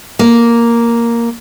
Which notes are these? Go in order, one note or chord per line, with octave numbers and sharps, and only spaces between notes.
A#3